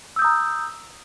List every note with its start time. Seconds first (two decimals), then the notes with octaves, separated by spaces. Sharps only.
0.16 E6
0.19 G6
0.22 D#6
0.24 A#5